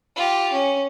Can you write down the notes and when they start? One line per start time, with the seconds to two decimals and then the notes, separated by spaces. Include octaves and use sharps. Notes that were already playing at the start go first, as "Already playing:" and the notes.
0.16 F4 G4
0.53 C#4